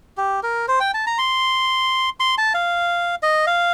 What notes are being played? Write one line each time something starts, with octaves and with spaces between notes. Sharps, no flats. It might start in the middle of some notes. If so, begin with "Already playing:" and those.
G4
A#4
C5
G5
A5
A#5
C6
C6
A5
F5
D#5
F5